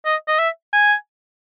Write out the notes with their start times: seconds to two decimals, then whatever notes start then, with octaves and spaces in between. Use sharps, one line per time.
0.05 D#5
0.28 D#5
0.39 E5
0.73 G#5